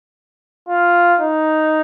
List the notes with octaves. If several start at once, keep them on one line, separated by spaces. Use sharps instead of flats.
F4
D#4